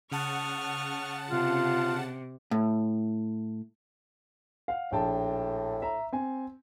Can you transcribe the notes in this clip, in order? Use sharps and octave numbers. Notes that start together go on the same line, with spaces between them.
C#3 F#5 A5 C#6 D#6 F6
C3 F4
A2
F5 F#5
A#1 A2 G5 A5
E5 A#5
C4 G#5